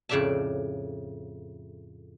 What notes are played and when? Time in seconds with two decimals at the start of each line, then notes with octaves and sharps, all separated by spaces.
0.09 F2 A2 C#3 D5 E5 A5